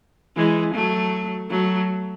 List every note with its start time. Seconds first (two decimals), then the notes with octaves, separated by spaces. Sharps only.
0.36 E3 G#3
0.74 F#3 A3
1.50 F#3 A3